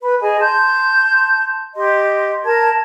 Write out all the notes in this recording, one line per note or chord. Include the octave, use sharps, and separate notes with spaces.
B4 B5
G#4 D#5 G#5
A5 C6 G6
G4 D#5 C6
A#4 A5 G#6